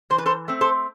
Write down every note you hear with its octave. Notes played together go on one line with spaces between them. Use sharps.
E3 C5
B4
A4 C5
A3 C4
A4 C5